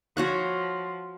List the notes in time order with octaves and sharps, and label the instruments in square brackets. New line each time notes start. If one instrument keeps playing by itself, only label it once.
[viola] F3 [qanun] F#4 C#5 F#5